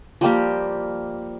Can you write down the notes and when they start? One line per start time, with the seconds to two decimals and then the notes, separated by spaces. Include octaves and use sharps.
0.21 F3 G3 A#3 G4